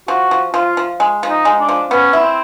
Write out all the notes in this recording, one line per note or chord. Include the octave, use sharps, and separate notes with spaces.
F3 F#4
F3
F3 F4
F3
G#3
F3
D#4
G#3
D4
F3
B3 C#4
E4
C4